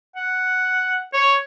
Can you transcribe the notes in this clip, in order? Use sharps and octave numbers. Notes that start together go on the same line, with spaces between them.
F#5
C#5